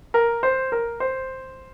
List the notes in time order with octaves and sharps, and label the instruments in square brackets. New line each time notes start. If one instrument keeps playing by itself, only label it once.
[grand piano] A#4
C5
A#4
C5